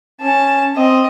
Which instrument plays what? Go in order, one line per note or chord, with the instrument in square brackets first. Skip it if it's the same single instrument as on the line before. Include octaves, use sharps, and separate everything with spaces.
[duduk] C#4 [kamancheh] A5
[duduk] C4 [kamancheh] D#5